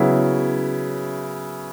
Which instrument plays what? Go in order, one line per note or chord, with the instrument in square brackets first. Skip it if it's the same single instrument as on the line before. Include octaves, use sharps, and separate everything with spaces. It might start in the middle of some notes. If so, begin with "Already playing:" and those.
Already playing: [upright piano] C#3 F#3 B3 E4